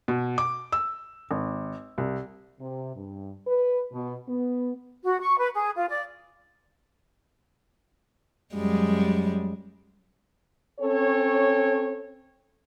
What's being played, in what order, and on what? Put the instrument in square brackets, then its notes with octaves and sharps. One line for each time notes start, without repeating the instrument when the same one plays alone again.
[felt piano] B2
D6
E6
G#1
C2
[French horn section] C3
G2
B4
B2
B3
[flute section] F#4
C#6
B4
G#4
F4
D5
[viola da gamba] F#2 G3 G#3
[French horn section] C4 C#4 A4 C#5